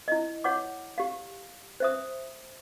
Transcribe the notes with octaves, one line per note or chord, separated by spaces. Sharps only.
E4 D#5
C#5 F#5 D6
G4 F5
C5 E5 D#6